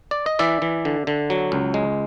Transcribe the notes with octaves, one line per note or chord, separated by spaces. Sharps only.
D5
D#5
E3 D5 E5
E3
D3
D3
F#3
C#2
G#3